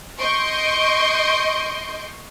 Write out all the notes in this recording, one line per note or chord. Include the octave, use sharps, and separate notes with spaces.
D#5 C6 C#6 G6 D7